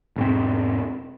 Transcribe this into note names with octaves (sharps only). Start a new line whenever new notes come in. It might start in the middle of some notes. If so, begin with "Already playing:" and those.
E1 G#2 C4